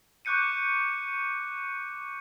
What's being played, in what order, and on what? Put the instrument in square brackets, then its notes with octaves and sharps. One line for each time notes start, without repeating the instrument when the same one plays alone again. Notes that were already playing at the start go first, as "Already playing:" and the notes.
[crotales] C#6 D6 F#6 G6 C#7 D#7